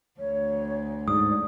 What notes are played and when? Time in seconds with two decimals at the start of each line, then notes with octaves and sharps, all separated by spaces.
0.18 D2 C#5
1.08 G#2 D5 D#6